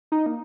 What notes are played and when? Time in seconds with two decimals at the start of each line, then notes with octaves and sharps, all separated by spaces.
0.12 D#4
0.26 A#3